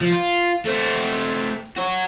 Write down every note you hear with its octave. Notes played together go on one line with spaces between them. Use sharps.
F3
F4
A3 C4
F#4 C#5